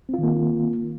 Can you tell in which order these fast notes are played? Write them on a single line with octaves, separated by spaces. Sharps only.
C4 F4 D#3 A#3